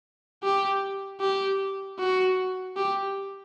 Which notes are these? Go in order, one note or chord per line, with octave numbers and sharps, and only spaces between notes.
G4
G4
F#4
G4